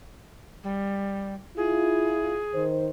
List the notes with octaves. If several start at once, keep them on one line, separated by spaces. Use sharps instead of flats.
G3
E4 F4 G#4
D#3 C5